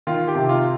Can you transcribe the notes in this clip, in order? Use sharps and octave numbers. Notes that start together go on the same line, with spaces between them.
D#3 F4
G4
C3
F4